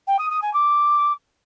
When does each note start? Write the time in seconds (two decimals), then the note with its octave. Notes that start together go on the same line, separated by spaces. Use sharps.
0.07 G5
0.19 D#6
0.30 D#6
0.42 G#5
0.53 D6